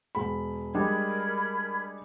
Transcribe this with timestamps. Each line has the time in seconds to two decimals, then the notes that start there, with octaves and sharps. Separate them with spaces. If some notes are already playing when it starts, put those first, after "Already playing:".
0.15 E1 B5
0.74 G3 G#3 D4 A#4 B5 G#6